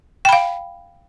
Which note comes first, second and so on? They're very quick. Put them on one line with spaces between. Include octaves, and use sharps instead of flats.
G5 B5 F5